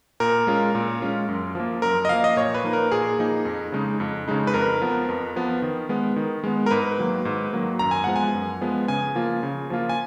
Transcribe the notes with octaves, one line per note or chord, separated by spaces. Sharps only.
A#2 A#4
G#3 C#4 F4
A#2
G#3 C#4 F4
F#2
F3 A#3
F#2 A#4
D#5
F3 A#3 F5
D#5
A#2 C#5
B4
F3 A#3 D#4
A#4
A#2 G#4
F3 A#3 D#4
F2
C#3 G#3 D#4
F2
C#3 G#3 D#4
B4
F2 A#4
F3 B3
F2
F3 B3
D#3
G#3 B3
D#3
G#3 B3
A#4
G#2 B4
D#3 F#3 A#3
G#2
D#3 F#3 A#3
F#2 A#5
G#5
F3 G#3 B3 F#5
G#5
F#2
F3 G#3 B3
C#3 G#5
F3 A#3 F4
C#3
F3 A#3 F4
G#5